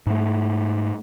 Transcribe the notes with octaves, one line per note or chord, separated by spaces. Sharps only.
G#2 A3